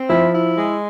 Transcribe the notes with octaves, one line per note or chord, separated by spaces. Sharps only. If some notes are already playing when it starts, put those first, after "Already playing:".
Already playing: C4
F3 E4
E4
G#3